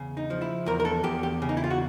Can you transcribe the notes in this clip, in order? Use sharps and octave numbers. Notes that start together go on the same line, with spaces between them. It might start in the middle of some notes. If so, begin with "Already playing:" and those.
Already playing: E2 C#3
D#4
F3
E4
E2 A#4
A#4
A4
E2 G4
G4
C#3
D#4
E4
F4
F#4